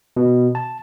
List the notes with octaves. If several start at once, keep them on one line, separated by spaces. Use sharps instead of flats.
B2
A5